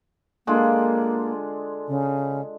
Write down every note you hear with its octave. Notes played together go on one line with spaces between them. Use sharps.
D3 G#3 A#3 F4
C#3